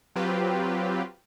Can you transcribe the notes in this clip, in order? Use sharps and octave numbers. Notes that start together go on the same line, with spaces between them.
F#3 C4 F4 G4 B4